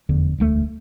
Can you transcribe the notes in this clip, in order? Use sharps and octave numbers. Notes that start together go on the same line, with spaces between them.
F1 E2 D3
E1 D2 D3 A3